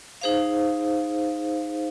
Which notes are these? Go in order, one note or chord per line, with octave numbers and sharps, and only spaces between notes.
D#4 G#4 C5 F5